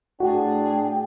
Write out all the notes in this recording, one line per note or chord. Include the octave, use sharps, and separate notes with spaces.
A2 D4 F#4 G#4 G5